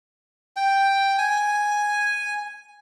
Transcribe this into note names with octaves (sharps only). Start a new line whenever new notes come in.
G5
G#5